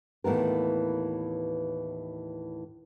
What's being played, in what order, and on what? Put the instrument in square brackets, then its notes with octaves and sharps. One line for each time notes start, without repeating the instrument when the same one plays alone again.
[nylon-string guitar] D#2 A2 E3 B3 A#4